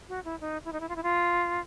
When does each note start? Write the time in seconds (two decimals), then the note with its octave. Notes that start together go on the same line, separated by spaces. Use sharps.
0.09 F#4
0.24 E4
0.41 D#4
0.65 E4
0.72 D#4
0.80 E4
0.89 F4
0.96 E4
1.03 F4